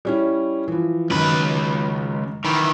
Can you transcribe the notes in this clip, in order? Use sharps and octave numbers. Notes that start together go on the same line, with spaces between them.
G3 C#4 E4
E3 F3
C#2 F#2 D#3 B4
D#3 E3 B5